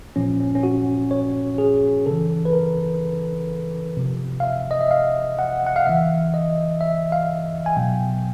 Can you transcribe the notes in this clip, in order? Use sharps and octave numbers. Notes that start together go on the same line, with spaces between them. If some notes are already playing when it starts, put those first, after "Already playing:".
A#2 F3 C#4
C#4
C#4
F#4
C#5
G#4
C#3 E3 A4
B4
A#4
C3 F3
F5
E5
D#5
E5
F5
F#5
F#5
F5
C#3 E3 E5
D#5
E5
F5
G#5
B2 F#3 G5